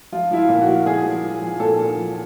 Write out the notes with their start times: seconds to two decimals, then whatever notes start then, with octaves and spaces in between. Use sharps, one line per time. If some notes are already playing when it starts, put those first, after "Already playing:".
0.12 F3 F4
0.31 F3 E4
0.37 F4
0.49 A#2
0.61 F#4
0.68 F3
0.86 A#2 G#4
1.04 F3
1.24 F3
1.42 F3
1.60 A#2 A4
1.79 A#2
1.97 F3